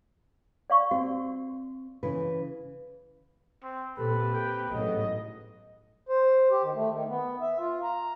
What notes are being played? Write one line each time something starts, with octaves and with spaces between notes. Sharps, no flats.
D5 F5 C#6
C4 F#4
C#3 E3 B4
C4
A#2 A#3 C4 G4 A4 B4
G5
A1 G#2 C#3 F#3 B3 A4 D#5
C5
G4
D#3
A3
D#3
B3
E5
F4
A#5